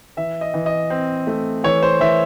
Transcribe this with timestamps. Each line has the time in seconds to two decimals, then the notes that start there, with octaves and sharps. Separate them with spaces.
0.17 E3 E5
0.41 D#5
0.54 E3
0.66 D#5
0.90 C4
1.27 A3
1.64 E3 C#5
1.83 C5
2.00 E3 E5